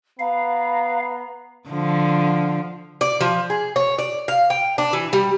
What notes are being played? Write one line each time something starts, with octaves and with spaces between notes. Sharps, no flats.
B3 F5 A#5 B5
D3 F3
D5
F3
G#4
C#5
D5
F5
G5
D4
E3
G3